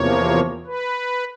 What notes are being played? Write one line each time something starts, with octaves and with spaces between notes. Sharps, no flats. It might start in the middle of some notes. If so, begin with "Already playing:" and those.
Already playing: E2 C3 F3 A#3 C#5
B4